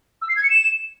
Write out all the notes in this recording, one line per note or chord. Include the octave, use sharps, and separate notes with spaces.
E6
C7
G#6
C#7
E7